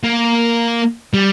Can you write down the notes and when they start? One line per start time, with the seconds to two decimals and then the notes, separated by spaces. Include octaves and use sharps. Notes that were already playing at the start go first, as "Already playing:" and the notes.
0.04 A#3
1.14 G3